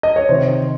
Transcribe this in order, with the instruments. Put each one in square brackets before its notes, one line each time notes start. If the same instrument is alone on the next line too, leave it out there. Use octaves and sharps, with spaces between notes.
[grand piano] D#5
C#5
C3 D#3 C5